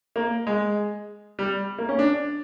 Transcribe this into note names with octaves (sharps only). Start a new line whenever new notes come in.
A#3
G#3
G3
A#3
C#4
D4